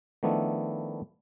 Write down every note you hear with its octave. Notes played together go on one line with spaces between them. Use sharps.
D#3 F3 A3 B3 D4 E4